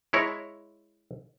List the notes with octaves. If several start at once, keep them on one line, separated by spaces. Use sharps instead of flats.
G#3 E4 C#5 A#5